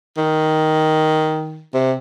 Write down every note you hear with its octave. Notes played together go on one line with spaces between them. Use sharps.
D#3
C3